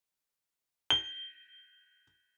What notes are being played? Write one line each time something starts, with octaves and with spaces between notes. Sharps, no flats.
G7